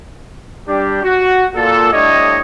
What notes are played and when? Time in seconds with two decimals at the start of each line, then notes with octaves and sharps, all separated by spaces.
0.68 G3 D4 G4
1.03 F#4
1.56 A#2 A4
1.92 A2 G3 D4 C#5 D#5